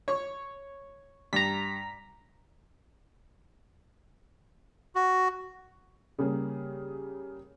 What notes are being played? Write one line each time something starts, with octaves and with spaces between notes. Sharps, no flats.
C#5 C#6
G2 A#5 B6
F#4
C#3 G3 A#3 G#4